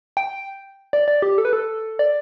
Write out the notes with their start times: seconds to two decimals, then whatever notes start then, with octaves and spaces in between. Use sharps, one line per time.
0.17 G5
0.93 D5
1.08 D5
1.22 G4
1.38 A4
1.45 B4
1.53 A4
1.99 D5